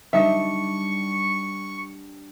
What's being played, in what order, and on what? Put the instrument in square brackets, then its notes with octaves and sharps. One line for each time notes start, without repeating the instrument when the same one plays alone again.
[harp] G3 D4 [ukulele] D#4 E5 [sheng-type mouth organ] C#6